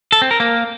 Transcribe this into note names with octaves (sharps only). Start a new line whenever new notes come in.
A4
C4
A#4
A#3